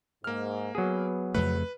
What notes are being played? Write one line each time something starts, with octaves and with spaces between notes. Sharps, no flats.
G#2 A#3 F6
F#3 B3 G#4
F2 C#3 A3 B4